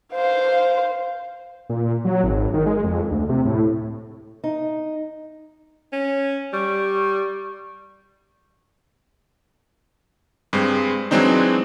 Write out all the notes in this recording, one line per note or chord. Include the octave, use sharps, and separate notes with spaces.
C5 F5
A#2
F#3
G#1
D#3
G#3
F2
D2
C3
A2
D#4
C#4
G3 C#6
G2 G#3 C4
E3 F#3 G#3 C4 D4 D#4